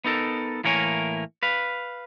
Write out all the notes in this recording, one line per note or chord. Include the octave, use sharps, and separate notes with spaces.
B3 D#4 A4 A#4
A2 E3 A#3 A#4 C#5 G#5
B4 F5